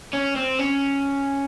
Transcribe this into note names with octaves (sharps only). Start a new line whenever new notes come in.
C#4
C4
C#4